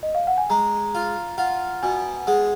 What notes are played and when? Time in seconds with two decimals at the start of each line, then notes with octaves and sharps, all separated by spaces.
0.03 D#5
0.15 F5
0.27 F#5
0.38 G#5
0.50 G#3 A#5
0.95 F4
1.38 F4 F#5
1.83 B2 G#5
2.27 G#3 F#5